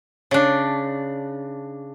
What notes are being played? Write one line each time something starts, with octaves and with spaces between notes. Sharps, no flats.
C#3 D4